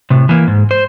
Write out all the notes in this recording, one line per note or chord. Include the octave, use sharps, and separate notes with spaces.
A2 C3
E3 A#3
G#2
C5